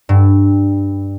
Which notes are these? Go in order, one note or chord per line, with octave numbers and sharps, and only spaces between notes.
G2